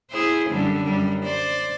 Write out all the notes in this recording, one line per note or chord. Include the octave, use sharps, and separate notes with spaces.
E4 G#4 C5
F#2 D3 G3
F#2 G3
C5 D5